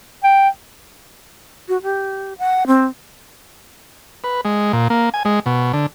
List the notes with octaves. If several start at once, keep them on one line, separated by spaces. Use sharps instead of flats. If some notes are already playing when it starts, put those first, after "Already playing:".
G5
F#4
G4
F#5
C4
B4
G#3
A#2
A#3
G#5
G#3
B2
D3